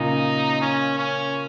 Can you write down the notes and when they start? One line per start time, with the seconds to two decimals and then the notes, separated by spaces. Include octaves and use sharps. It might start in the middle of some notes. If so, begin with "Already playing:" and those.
Already playing: A#2 C#3 D#4
0.62 C#4
0.98 C#4